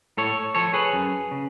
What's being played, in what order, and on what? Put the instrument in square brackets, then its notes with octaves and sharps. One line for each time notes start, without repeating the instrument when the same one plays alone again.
[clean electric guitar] A2 A4 C#5
F3 A4 C#5
G#4 B4
F#2
C#3